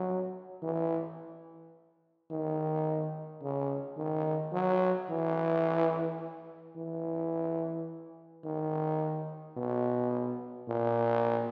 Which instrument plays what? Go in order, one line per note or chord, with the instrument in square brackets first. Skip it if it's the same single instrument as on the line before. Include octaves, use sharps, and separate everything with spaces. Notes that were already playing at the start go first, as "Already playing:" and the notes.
Already playing: [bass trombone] F#3
E3
D#3
C#3
D#3
F#3
E3
E3
D#3
B2
A#2